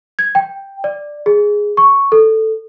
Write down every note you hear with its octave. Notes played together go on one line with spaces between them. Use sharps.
G#6
G5
D5
G#4
C#6
A4